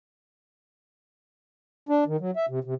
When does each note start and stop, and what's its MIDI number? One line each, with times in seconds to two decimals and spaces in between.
1.89 2.04 62
2.07 2.17 51
2.20 2.31 54
2.36 2.46 76
2.49 2.59 48
2.64 2.74 48